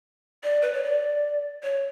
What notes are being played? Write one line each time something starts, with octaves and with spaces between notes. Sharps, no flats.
D5
B4
C#5
D5
C#5